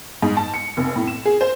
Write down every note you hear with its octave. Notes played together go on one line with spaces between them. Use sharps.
G#2
A5
C#7
F1
A2
E7
G#4
C5